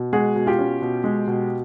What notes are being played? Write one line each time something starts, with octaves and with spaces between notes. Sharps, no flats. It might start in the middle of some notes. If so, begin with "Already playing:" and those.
Already playing: B2
G#3 F#4 G#4
B2
F4 G4
C#4
B2
G#3
B2